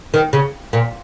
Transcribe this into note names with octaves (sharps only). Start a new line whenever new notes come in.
D#3
C#3
A#2